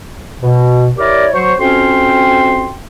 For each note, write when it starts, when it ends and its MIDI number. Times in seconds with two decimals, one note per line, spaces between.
0.41 0.90 47
0.98 1.27 64
0.98 1.27 67
0.98 1.27 70
0.98 1.27 73
0.98 1.27 74
1.33 1.53 54
1.33 1.53 72
1.33 1.53 85
1.59 2.72 41
1.59 2.72 60
1.59 2.72 61
1.59 2.72 66
1.59 2.72 79
1.59 2.72 84